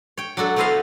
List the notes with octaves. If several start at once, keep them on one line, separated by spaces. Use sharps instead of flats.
C#5 G5
F#3 D4 F#4 A4
A3 B3 E4 C5 D#5 F5